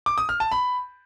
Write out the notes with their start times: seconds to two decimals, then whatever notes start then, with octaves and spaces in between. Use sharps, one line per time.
0.06 D6
0.18 D#6
0.29 F6
0.40 A5
0.52 B5